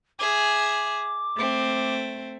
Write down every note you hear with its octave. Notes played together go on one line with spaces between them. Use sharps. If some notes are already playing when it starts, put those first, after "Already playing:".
G#4 E5 D6
A3 C4